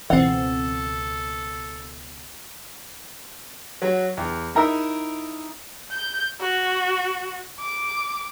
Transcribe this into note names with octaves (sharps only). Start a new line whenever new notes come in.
C#2 B2 E3 C4 A4 F#5
F#3 F#4
E2
D#4 E4 A#4 D#5 E5
G6
F#4
D6